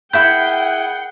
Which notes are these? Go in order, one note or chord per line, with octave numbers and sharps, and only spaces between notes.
E4 G#4 A#4 E5 F#5 G5 B5 G6